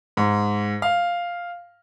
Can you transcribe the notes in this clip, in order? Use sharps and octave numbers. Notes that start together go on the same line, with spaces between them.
G#2
F5